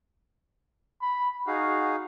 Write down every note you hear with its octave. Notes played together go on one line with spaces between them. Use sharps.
B5
D#4 F#4 G#4 F5